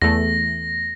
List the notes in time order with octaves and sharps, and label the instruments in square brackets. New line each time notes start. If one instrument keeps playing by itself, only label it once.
[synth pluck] E2 A3 [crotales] A#6